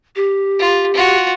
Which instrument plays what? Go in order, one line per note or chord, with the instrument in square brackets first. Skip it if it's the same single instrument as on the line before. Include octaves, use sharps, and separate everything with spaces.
[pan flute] G4
[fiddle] F4
F4 F#4